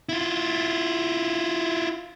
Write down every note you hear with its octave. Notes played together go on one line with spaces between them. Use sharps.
E4 F4